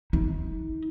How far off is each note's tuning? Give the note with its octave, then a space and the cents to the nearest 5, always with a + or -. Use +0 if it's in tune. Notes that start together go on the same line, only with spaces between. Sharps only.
D#4 +40